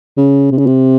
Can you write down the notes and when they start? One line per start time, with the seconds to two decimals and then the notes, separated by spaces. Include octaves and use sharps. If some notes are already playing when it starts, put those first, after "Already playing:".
0.17 C#3
0.51 C3
0.58 C#3
0.66 C3